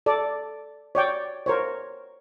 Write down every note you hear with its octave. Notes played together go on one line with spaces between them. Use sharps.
A4 D5
C#5 D5 G5
A#4 C5 C#5